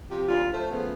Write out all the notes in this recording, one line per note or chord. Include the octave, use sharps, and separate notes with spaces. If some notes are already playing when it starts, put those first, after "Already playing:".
C3 F3 G4
D2 A#2 F#3 F4
A3 C5
C#3 F3 A3 B3